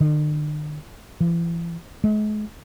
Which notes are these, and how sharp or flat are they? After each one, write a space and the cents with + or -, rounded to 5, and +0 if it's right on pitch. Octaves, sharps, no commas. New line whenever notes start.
D3 +45
E3 +40
G#3 +40